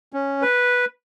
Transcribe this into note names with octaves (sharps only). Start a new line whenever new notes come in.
C#4
B4